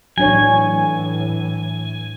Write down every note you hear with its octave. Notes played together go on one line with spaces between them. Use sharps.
A2 E3 F#3 D4 C#5 G#5